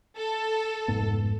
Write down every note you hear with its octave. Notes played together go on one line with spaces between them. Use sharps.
A4
F1 G#2 B3